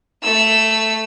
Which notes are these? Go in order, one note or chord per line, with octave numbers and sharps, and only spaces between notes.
A3 E6